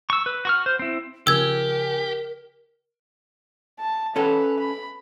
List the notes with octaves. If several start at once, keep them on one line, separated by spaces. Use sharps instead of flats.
C#6 E6
B4
F#4 C#6 F6
C5
C4 E4
C#3 F3 G4 A#4 E6 G#6
A5
C#4 A4 B4
B5